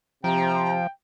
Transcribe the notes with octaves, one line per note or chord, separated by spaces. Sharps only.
C3 F3 G5 A#5